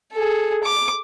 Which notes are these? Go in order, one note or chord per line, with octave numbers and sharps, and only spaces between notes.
G#4 A4
D6